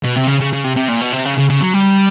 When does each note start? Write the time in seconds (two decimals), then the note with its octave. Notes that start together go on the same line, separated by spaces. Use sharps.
0.04 B2
0.17 C3
0.28 C#3
0.41 C#3
0.53 C#3
0.64 C3
0.76 C3
0.89 A#2
1.01 B2
1.13 C3
1.26 C#3
1.38 C#3
1.50 C#3
1.61 F#3
1.74 G3